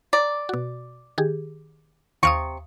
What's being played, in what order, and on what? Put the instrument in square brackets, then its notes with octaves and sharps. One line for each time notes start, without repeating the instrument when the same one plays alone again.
[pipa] D5 [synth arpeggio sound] A#5
[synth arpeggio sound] B2 F#4
D#3 G4 G#4
[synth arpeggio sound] D#2 F5 D#6 [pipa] C3 C#6